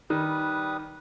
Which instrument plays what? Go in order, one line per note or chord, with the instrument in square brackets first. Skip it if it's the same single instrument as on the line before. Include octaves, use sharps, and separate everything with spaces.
[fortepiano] D#3 [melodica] G3 B4 D#6